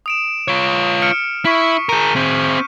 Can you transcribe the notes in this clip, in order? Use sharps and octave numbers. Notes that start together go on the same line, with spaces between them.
D#6 D7 E7
F4 C#5
F6 C#7 D7
E4 C#6 B6
G#4 A#4 G6 D#7
C4 G#4